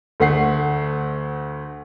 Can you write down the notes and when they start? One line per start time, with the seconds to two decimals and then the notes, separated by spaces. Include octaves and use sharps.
0.20 D2 A3 F#5 C7